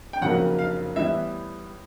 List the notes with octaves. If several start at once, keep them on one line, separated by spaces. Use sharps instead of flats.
G5
F1 F2 C#3 F#3 A#3 F#5
F5
A2 E3 G3 B3 E5